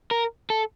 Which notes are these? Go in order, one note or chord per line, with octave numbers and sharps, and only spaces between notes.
A#4
A4